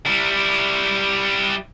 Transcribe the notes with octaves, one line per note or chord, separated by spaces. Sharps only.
G3 E4